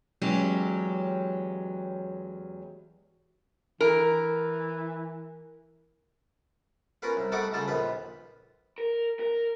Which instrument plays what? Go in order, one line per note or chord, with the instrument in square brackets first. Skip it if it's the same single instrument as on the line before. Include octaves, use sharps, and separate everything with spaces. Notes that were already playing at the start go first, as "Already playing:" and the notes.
[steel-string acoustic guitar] E2 F#3 G#3 C#4 G4
[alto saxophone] E3 [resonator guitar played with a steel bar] A#4
[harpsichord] C#4 F4 A#4 B4 F5
C2
G3 A3 D#4 F#5 C#6 D6
C#3 G3 F4 A4
A#1 D#2 F4 B4
[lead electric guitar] A#4
A#4